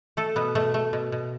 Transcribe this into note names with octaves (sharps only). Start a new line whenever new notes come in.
A3 A4
B2 B3
B2 A3
A3
B2
B2